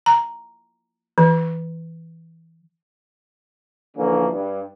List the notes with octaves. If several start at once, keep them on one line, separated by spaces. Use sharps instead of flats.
A#5
E3
D3 E3 F3 A#3 C#4
G2